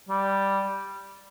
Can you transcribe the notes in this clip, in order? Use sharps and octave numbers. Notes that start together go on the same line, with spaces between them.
G3